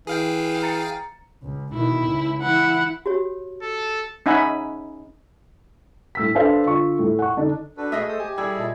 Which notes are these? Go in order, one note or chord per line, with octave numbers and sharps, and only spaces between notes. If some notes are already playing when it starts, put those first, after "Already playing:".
E3 G#4 F5 G5
A#5 A6 C#7
C#2
B2 D#3 E4
C#2
E3 E4 F#5
F#4 G4 C#5
A4
C#4 D#4 E5 F#5 G#5 B5
A2 E6 B6
D4 A4 B4 C5 F5
D3 F4 C#6
A2 A3
F#5 C#6
D3 D4 D#4
D4 F#4 A4 B4
A3 G#4 D#5 E5 D#6 F6 A#6
A4 C5 D#6
G4 G#5
G3 E4 G#4 A4 G5 E6 G#6
A#2 D#5 E5 A5